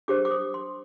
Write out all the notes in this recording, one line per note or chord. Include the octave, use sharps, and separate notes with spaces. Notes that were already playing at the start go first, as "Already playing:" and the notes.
D4 G4 C5 D6
D6
D#6
C6